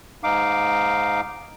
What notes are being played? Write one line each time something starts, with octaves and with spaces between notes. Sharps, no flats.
G#2 D#4 F5 D6